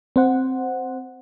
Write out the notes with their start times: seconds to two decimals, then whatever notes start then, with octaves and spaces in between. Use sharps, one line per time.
0.16 C4 C5 F#5